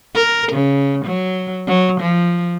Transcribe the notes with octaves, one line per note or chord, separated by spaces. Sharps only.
A#4
C#3
F#3
F#3
F3